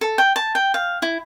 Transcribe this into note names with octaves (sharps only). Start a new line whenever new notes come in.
A4
G5
A5
G5
F5
E4